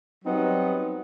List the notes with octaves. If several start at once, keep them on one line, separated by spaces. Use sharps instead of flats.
F#3 G3 B3 C4 D#4